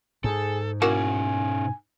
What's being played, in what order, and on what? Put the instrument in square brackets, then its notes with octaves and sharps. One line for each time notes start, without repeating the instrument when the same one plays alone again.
[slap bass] G#2 [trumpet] G#4 [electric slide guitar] A4
[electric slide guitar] B2 C#4 [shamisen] A#3 E4 F#4 [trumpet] G#5